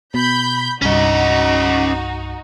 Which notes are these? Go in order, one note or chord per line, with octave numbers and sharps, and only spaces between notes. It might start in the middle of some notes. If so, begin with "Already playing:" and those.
B2 B5 G6
C2 G2 C#4 D#4 F#4 D#5